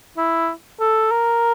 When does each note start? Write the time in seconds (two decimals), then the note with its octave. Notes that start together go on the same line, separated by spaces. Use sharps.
0.17 E4
0.80 A4
1.11 A#4